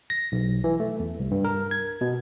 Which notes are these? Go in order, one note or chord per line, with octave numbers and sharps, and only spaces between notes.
A#6
B1
E3
A3
E2
C2
G2
A#4
G#6
B2